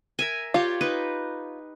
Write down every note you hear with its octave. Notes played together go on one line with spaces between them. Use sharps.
A#4 E5 G#5
F4 G4 C#5 D5
D#4 B4